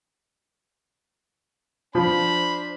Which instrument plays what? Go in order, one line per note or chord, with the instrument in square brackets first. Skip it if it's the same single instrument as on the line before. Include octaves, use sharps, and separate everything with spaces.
[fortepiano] F3 [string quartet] D4 C5 [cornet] B5